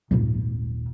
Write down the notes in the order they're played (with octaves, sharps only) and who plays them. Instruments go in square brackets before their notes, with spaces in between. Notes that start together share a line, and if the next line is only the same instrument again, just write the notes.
[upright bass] D#1 G#1